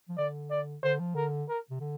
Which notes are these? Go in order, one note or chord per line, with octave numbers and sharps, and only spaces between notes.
F3
D3 D5
D5
D3 C5
F3
D3 A#4
A#4
C3
D3